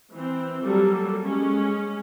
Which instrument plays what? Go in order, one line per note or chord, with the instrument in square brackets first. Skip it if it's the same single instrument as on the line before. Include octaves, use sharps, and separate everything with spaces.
[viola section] E3 C4
F#3 G3 A#3 A4
G#3 C#4